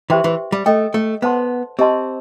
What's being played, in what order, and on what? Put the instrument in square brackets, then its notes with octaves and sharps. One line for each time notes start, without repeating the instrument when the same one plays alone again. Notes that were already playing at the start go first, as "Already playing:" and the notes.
[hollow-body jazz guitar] E3 [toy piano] G4 C5 E5 G5 C6
[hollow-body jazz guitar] E3
G3
[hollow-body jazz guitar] A3 [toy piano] A4 D#5 G5
[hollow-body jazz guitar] A3
[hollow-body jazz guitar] B3 [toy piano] C5 F#5 A5 C6
[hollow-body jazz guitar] C4 [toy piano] G4 D#5 A5 C6